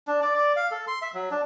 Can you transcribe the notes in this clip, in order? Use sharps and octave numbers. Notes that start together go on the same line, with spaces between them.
D4
D5
D5
F5
A4
C6
E5
F#3
D4